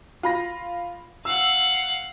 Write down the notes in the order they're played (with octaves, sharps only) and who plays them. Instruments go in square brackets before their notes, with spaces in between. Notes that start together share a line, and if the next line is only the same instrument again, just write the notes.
[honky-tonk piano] F4 B5 A#6
[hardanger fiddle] F5 F#5 [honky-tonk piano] E6